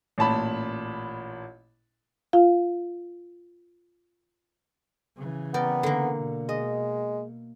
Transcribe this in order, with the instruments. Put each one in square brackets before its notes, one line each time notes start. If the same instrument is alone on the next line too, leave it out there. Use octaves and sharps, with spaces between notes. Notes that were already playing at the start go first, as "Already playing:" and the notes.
[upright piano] A1 A#2 A5 B5
[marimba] F4 F5
[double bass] C#3 E3
[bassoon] B3 [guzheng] A#4 D5 G5
[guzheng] D3 A#3
[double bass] B2
[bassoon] G#3 [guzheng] D#5